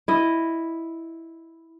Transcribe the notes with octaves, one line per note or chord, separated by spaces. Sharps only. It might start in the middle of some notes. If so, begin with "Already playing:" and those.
E4 D#5